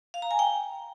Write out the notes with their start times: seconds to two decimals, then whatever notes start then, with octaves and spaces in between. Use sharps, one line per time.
0.14 F5
0.22 A#5
0.31 G#5
0.39 G5